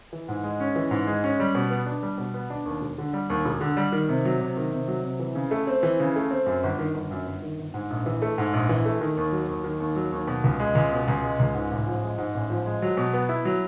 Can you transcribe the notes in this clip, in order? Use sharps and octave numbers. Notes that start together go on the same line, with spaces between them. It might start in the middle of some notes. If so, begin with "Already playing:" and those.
E3
G#2
G#3
C#4
E3
G#2
G#3
C#4
G3
B2
B3
D4
G3
B2
B3
D4
D#2
E1
D3
G3
D#2
E1
D3
G3
D#3
C3
F#3
C3
D#3
C3
F#3
C3
E3
C#3
A3
C4
E3
C#3
A3
C4
F#2
G1
D#3
G1
F#2
G1
D#3
G1
G#2
A#1
E3
A3
G#2
A#1
E3
A3
D#3
D#2
F#3
D#2
D#3
D#2
F#3
D#2
B2
C#2
G#3
C#2
B2
C#2
G#3
C#2
G#2
A1
F3
G#3
G#2
A1
F3
G#3
F#3
B2
B3
E4
F#3